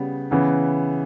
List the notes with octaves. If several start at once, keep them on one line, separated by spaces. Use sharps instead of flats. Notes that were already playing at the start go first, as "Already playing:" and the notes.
Already playing: C#3 G3 B3
C#3 E3 B3